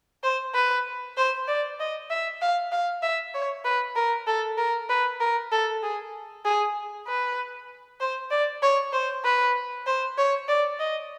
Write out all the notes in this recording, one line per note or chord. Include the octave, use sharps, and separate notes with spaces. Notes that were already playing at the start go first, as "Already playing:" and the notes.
C5
B4
C5
D5
D#5
E5
F5
F5
E5
C#5
B4
A#4
A4
A#4
B4
A#4
A4
G#4
G#4
B4
C5
D5
C#5
C5
B4
C5
C#5
D5
D#5